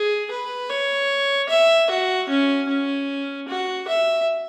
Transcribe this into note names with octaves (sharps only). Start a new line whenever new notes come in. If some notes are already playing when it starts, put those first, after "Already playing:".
Already playing: G#4
B4
C#5
E5
F#4
C#4
C#4
F#4
E5